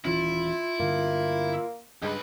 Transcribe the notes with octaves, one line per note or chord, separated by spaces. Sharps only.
D#1 E3 C#4 E4 F4
G2 D3 A#3
C#2 G2 G#3 B4